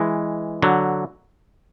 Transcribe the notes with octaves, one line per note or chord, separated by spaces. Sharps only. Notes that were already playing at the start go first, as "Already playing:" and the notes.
Already playing: E3 G#3
D3 F#3